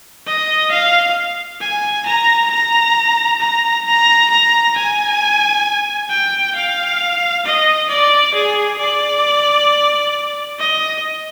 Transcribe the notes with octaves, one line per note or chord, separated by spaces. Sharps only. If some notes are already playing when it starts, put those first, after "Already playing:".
D#5
F5
G#5
A#5
A#5
A#5
A#5
A#5
G#5
G5
F5
D#5
D5
G#4
D5
D#5